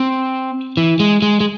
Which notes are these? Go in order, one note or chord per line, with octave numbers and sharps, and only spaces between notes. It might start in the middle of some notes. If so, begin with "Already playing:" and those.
Already playing: C4
E3
G#3
G#3
G#3